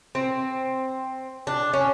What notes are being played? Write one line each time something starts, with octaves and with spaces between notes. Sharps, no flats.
C4
D4
C#4